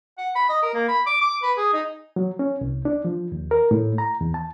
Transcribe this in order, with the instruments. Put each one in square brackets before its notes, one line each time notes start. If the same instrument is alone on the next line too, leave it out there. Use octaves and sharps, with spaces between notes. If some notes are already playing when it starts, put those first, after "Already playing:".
[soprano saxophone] F#5
B5
D#5
A#4
A#3
B5
D6
D6
B4
G#4
D#4
[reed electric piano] F#3
C#4
C2
D4
F3
D#2
A#4
A2
A#5
E2
A5